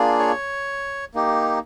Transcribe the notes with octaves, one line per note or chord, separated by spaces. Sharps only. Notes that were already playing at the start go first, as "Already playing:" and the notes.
Already playing: A#3 D4 F4 G#4
C#5
A#3 D#4 G4